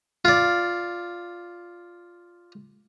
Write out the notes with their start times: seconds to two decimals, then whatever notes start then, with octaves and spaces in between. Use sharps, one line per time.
0.25 F4 D5